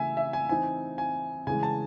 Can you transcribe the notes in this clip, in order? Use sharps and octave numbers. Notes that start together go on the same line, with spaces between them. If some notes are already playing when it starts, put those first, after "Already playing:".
Already playing: C#3 E3 A3 E5 G#5
E5
G#5
E3 C4 D#4 G#5
G#5
C#3 E3 G#3 G#5
A5